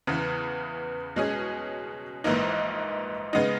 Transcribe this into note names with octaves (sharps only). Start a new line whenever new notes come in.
E2 C#3 E3 B3
B2 G#3 C#4 G#4
A#1 G#2 E3 A#3 D#4
C#3 G#3 B3 D#4